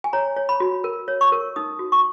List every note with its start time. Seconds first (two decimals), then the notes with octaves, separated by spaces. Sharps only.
0.04 G#5
0.13 C#5 A#5
0.37 C#5
0.49 B5
0.60 F#4
0.84 A#4
1.08 C#5
1.21 C#6
1.32 A#4
1.56 D#4 D#6
1.79 F#4
1.92 C#6